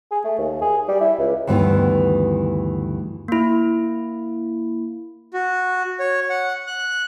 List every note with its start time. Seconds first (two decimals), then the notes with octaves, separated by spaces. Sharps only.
0.11 G#4
0.24 A3
0.39 D#2
0.61 G#4
0.88 G3
1.01 E4
1.19 C#2
1.47 D2 G2 D#3 E3 B3
3.28 A#3 E4
5.34 F#4
6.00 C#5
6.30 F#5
6.67 F#6